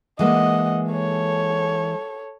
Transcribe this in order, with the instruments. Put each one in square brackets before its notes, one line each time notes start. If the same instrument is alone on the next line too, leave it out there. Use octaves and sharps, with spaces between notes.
[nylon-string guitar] E3 G#3 A#3 [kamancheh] D#5 F#5
[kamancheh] A4 C#5